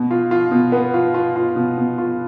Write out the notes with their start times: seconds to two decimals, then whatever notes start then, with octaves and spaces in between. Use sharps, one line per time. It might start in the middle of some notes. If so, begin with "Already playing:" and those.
Already playing: B2
0.11 F4
0.31 F4
0.51 B2
0.72 B3
0.94 F4
1.14 F4
1.36 F4
1.56 B2
1.78 B2
1.98 F4